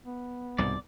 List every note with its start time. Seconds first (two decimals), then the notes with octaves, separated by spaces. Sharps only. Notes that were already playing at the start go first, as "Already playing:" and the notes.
0.06 B3
0.58 C2 G#2 B2 D5